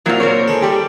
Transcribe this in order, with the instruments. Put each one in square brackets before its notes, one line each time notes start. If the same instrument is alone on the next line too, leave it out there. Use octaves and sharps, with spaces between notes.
[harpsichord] A#2 [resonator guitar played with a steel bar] F#3 C4 F4
[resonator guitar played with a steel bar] A#4 C5 C#5
[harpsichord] G#3 A4
[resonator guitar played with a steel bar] G3 G4